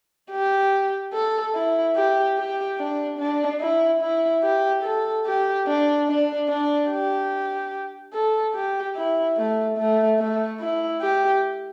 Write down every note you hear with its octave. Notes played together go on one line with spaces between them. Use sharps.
G4
A4
E4
G4
G4
D4
D4
E4
E4
G4
A4
G4
D4
D4
D4
G4
A4
G4
E4
A3
A3
A3
E4
G4